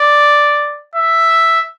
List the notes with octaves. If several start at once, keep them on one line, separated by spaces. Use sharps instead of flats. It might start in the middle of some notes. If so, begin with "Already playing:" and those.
Already playing: D5
E5